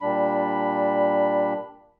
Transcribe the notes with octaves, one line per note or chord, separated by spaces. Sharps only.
A#2 G3 D4 B5